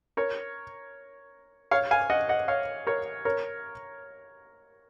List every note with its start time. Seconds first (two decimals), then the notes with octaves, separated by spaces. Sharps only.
0.17 A#4 C#5
1.71 C#5 F5
1.91 F5 G#5
2.10 D#5 F#5
2.29 D#5 F#5
2.48 C#5 F5
2.87 A#4 C#5
3.25 A#4 C#5